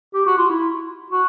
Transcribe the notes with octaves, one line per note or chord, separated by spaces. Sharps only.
G4
F#4
F4
E4
F#4